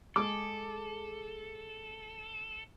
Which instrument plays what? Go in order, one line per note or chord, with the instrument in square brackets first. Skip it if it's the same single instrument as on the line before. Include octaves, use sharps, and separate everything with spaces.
[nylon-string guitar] G#3 G#4 [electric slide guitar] A4 [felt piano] D6